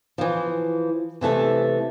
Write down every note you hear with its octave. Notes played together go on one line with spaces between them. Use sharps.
E3 F3
C3 E3 A3 A4